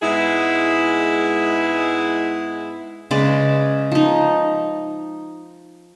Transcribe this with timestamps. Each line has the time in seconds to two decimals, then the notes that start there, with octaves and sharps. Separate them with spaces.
0.02 G#2 G#3 B3 E4 G#4
3.11 C#3 G#3 B4 D5
3.92 F3 D#4